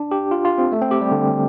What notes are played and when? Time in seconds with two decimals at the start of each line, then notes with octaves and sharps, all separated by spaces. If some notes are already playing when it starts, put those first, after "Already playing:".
Already playing: D4
0.11 G4
0.31 F4
0.45 F4
0.58 C4
0.72 A3
0.81 C4
0.91 G4
1.01 G3
1.12 D3